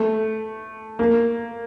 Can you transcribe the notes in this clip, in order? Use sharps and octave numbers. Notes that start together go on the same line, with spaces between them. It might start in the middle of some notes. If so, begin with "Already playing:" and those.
Already playing: A3
A#3